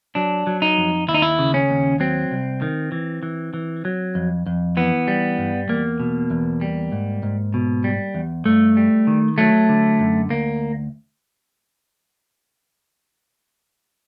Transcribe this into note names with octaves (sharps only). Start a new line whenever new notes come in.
F#3 D4
F#3
D#4
F2
D#2 E4
D#4
E4
C#3
C#4
D#2
F#3 C4
C2
D#3
E3
E3
E3
F#3
F2
F2
E3 B3
G3
G2
E2 A#3
B2
E2
G3
G#2
G#2
B2
G3
E2
G2 A3
G3
D#3
F#3 A3
D3
F#2
D2 A#3